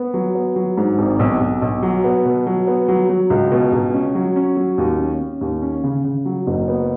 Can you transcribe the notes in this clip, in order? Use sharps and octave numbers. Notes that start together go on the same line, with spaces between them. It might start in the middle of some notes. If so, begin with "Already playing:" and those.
Already playing: B3
F#3
B3
F#3
G#2
G#1
B1
B1
B1
F#3
B3
B2
F#3
B3
F#3
F#3
C#2
B2
C#2
C#4
F#3
C#4
F#3
D#2
C#4
C#4
D#2
C#4
C#3
C#3
F#3
F#1
B3